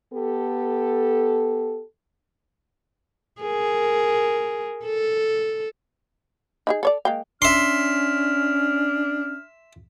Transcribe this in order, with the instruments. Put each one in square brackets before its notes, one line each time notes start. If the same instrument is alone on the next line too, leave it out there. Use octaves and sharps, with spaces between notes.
[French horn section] B3 G4 A4
[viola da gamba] G#4 A#4
A4
[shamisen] D#4 E4 G#4
A4 C#5 D5
G#3 A#3 G5
[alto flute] C#4 [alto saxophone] D4 [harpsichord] E5 C6 [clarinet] F6